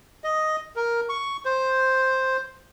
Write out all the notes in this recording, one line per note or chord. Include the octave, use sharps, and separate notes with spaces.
D#5
A#4
C#6
C5